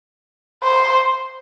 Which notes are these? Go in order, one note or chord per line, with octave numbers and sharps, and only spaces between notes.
C5